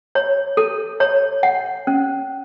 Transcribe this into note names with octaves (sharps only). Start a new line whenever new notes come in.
C#5
A4
C#5
F#5
C#4